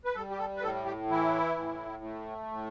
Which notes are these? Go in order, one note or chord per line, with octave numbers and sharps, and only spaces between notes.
B4
G3 A4
G4
A4
B4
A2 A4
G4
E3 E4
A2
A3
A2